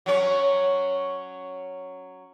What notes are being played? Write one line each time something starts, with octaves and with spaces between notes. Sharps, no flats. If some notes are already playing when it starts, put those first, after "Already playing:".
F#3 C#4 C#5